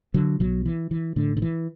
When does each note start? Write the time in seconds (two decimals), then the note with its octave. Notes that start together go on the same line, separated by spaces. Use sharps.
0.14 D3 F#3
0.40 B1 B2 D3 F#3
0.66 E3
0.91 E3
1.16 A1 A2 D3
1.37 D3
1.42 E3